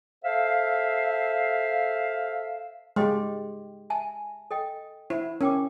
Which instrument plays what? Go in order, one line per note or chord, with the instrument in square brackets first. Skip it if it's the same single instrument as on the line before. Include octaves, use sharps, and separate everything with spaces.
[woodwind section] A4 C5 E5 F5
[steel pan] G#3 G4 [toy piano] D#5 G5 C6
[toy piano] E5 G#5 A5
A4 D#5 G5
[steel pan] E4 [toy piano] C5
[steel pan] C#4 [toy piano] A#4 G5 D6